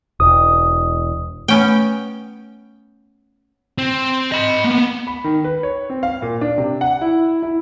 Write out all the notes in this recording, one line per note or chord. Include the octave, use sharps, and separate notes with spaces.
E1 D#6
A3 B3 C#4 G5
C4
D#5 B5
A#3 B3
B5
D#3
B4
C#5
C4
F5
A#2
D4
C3
F#5
E4
E4